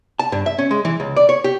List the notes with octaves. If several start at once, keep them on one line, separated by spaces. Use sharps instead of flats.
A5
G2
E5
C#4
G#3
E3
C#2
D5
C#5
G4